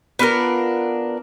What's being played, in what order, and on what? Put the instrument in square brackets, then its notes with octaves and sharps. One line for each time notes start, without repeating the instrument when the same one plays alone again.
[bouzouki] B3 D4 F4 A#4